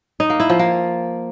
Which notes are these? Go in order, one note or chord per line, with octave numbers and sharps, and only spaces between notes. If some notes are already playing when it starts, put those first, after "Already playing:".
D#4
A#3
E4
F3
A#3